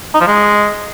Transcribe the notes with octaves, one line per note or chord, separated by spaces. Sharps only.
D#4
F3
G#3